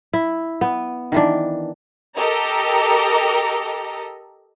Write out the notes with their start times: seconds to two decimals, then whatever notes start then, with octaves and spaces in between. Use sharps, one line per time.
0.13 E4
0.61 B3
1.12 D#3 E3 D4
2.16 G4 A4 A#4 D#5 A#5